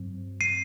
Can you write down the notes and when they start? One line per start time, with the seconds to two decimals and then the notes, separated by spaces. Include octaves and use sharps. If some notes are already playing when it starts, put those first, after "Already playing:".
Already playing: G2 F#3 C4
0.41 C7 D#7